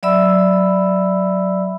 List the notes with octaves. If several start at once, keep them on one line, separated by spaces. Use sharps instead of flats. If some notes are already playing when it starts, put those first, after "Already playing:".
F#3 D5 E5 B5 E6